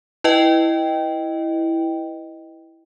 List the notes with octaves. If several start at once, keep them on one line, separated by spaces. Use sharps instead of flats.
E4 B4 D#5 G5